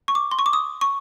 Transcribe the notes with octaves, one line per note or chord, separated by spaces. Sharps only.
C#6
D6
C6
C#6
D6
D#6
C#6